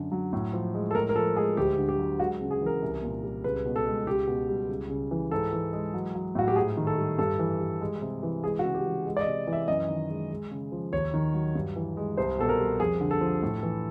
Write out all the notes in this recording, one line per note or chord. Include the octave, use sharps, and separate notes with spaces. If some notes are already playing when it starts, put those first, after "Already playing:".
Already playing: F#2 D3
F#3
A2
F3
G#3
A4
A2 A#4
A#4
F3 A4
G#3 G#4
D2 G4
D3
G4
F#3
G#3 F#4
C#3
G#4
E3
A#4
C2
A#2
G3
C#2 B4
B2
A4
G#3
C#2 G4
B2
G3
C#2
C#3
E3
G#2 A4
E3
G#3
F#3
F#3
A2 F#4
G4
G#2 G#4
D#3
A4
G3
G2 A4
E3
G3
G#3
C3
E3
G#3 G#4
F#4
C#3
G4
E3
G#3
D5
D#5
C3
E3
E5
F#2 D#5
D#3
G#3
G#3
C#3
F3
D#2 C#5
D#3
F#3
G2
E3
G#3
C2 C5
B2 A4
A#4
G3
F2 G#4
D3
A4
F3
A2
E3